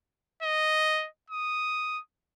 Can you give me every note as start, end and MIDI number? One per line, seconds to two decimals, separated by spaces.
0.43 1.07 75
1.30 2.00 87